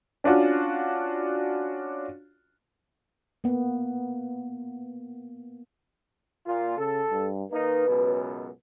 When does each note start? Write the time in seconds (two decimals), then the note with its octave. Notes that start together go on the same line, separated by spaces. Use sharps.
0.24 C#4 D4 F4 F#4
3.44 A#3 B3
6.46 A#2 F4
6.78 C#3 A4
7.11 G2
7.52 D#3 A#3 D#4 B4
7.87 C#2 F#2 B2